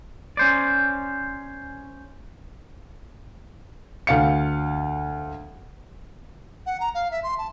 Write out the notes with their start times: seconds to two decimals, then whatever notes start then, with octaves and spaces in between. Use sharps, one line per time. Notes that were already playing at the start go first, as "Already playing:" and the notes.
0.37 C#4 C5 D5
4.07 D2 F5 C#7
6.66 F#5
6.80 A#5
6.95 F5
7.11 E5
7.23 C6
7.38 A5